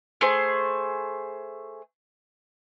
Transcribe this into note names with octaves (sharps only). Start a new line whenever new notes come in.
A3 G#4 C5